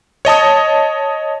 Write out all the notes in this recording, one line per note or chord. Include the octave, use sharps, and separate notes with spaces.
C#5 D#5 A5 D#6